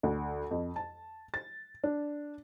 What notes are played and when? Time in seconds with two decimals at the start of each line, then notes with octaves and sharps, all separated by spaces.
0.03 D2
0.51 F2
0.76 A5
1.34 A6
1.84 D4